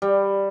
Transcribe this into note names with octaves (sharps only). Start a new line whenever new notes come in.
G3